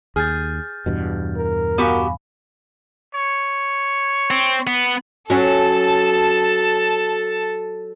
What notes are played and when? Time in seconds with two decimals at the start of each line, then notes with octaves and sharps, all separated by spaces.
0.16 D#2 G#4 F6 G6 A6
0.86 E2 G2 B2
1.37 A#4
1.78 B3 F#4 G4 F5 G#5 B5
3.15 C#5
4.31 C4
4.67 B3
5.30 F#3 C#4 A4 A5